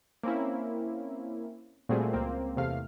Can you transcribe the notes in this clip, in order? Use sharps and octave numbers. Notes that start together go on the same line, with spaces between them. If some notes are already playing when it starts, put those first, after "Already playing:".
A#3 C4 C#4 E4
A#2 G3 A3 C4 F#4 G#4
C#2 A#3 C4
E2 C3 A3 F5 F6